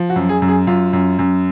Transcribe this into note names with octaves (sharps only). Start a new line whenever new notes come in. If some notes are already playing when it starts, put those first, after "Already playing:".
Already playing: F3
F#4
F#2
G#4
F#2
G#4
F#2 F4
F#2
F#2